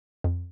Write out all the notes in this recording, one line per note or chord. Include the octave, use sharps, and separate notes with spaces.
F2